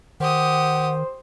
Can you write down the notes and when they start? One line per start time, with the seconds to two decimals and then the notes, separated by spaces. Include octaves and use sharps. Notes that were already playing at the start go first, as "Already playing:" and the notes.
0.20 D#3 G4 C5 F#5 D#6